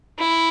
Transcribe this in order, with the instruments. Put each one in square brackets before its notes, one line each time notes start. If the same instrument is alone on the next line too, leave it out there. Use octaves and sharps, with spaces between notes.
[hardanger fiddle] E4